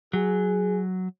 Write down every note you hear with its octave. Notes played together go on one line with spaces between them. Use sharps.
F#3 G#4